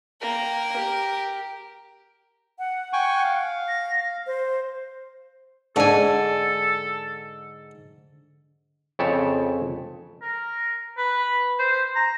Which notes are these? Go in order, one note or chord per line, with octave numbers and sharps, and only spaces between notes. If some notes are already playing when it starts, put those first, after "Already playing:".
A#3 A#4 G5
G4
F#5
G5 G#5 C#6
F5
A#6
C5
G#2 D3 A4 G#5
F2 C#3 C#5 E5 G5 A5
A#4
B4
C5
A#5